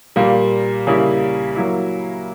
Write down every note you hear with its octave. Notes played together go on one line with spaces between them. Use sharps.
A#2 G3 A#3
C#3 G3 A#3 E4
F#3 A#3 E4